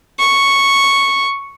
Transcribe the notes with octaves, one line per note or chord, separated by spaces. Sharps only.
C#6